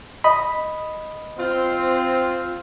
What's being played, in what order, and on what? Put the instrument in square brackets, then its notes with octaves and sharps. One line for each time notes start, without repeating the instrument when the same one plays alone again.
[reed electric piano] D#5 B5
[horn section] C4 F4